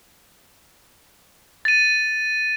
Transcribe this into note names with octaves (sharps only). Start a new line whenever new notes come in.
A6 D#7